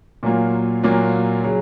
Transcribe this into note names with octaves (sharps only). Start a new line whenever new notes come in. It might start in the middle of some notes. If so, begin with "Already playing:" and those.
A#2 F#3 A#3 F4
A#2 F#3 A#3 F4
C#3 F#3